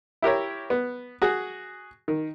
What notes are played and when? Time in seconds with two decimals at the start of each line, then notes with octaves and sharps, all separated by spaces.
0.22 E4 G4 A#4 C#5
0.70 B3
1.22 F#4 G#4
2.08 D#3